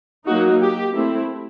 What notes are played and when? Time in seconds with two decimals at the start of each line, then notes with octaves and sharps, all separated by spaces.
0.26 F#3 A#3 D#4 F#4
0.61 G4
0.94 A3 C4 E4